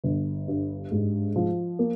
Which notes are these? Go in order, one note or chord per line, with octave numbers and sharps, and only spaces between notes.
G1
G2
G#2
F3
A#3